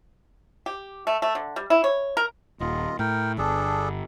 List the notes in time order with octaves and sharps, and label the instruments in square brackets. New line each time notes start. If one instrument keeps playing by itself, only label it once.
[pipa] G4
A3
A3
D3
G3
E4
C#5
A#4
[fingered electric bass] D#1 [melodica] F4 D#5
[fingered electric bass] A2 [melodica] A#4 G5
[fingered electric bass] G1 [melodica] D4 G#4 A4